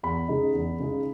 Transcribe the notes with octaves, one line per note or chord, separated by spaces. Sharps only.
E2 B5
C#3 G#3 D#4
E2
C#3 G#3 D#4